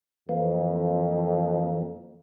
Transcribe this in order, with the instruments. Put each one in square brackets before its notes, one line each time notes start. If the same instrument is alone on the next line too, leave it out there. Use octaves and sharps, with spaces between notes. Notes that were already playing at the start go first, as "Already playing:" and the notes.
[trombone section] F2 [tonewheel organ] E3 A#3